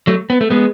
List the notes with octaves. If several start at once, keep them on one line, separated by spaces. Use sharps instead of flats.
F#3 A3
B3
A3
G#3 B3